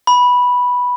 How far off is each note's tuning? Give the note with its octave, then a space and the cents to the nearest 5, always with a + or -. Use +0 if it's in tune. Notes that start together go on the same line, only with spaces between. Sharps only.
B5 -5